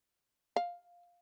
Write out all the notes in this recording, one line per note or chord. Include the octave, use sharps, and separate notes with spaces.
F5